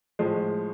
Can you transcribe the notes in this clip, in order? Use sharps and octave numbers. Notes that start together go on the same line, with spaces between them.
A2 F3 G#3